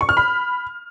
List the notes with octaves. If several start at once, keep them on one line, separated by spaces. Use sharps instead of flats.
C#6
F6
B5